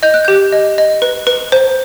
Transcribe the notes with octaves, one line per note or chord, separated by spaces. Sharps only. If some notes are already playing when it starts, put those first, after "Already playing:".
D#5 G6
F#6
G4 G6
D#5
D#5
B4
B4
C5